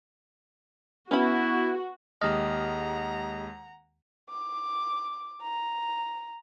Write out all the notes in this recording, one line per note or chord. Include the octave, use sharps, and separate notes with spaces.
B3 C#4 E4 F#4 B5
D#2 G#3 G4 D#5 F#5 A#5 F6
D6
A#5